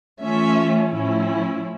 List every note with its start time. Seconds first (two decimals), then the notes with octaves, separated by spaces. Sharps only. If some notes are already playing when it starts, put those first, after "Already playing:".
0.21 E3 A3 C#4 F4 E5
0.92 A2 F3 C#4 E4